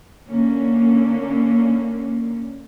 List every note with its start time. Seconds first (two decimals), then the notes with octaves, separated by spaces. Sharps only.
0.27 D3 A#3 C#4